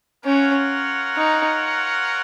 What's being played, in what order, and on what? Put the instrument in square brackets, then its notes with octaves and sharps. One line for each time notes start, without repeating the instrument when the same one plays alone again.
[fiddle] C#4 [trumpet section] F4 A#4 C#5 F#5
[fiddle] D#4